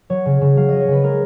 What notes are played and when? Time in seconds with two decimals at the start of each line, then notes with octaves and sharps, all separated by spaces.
0.10 F#3 C#5
0.26 C#3
0.41 C#3
0.57 F#3 F5
0.69 F#3 D#5
0.80 C#5
0.88 C#3 B4
1.03 G#3 A#4